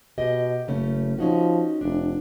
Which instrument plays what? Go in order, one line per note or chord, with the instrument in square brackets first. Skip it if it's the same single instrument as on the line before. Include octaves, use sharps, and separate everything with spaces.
[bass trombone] B2 [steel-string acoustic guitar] G4 D#5
[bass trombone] F#1 [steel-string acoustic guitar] C#3 A3 C#4
[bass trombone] F3 [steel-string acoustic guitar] C#4 D#4 F#4
[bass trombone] F1 [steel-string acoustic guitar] D4